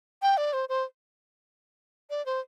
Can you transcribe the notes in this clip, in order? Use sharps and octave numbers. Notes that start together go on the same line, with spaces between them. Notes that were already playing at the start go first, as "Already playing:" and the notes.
G5
D5
C5
C5
D5
C5